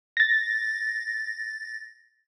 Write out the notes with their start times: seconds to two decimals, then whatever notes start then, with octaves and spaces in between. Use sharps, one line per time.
0.17 A6 A#6